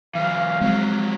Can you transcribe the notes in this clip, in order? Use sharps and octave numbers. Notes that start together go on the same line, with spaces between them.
E3 F#3 F5
F3 F#3 G#3 C4